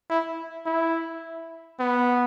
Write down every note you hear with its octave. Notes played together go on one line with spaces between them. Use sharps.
E4
E4
B3